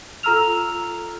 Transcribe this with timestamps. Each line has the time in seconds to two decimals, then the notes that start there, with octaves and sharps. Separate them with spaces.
0.23 F4 A4 A#5 E6 F6 F7